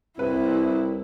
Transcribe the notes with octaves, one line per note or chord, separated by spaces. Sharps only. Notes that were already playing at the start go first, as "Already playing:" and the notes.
C2 C3 E4 B4